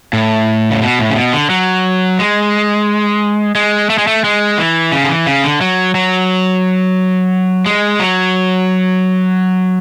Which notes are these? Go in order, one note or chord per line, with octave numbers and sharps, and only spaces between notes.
A2
C#3
B2
A2
C#3
B2
D3
F#3
G#3
G#3
A3
G#3
A3
G#3
E3
C#3
D3
E3
C#3
D3
F#3
F#3
G#3
F#3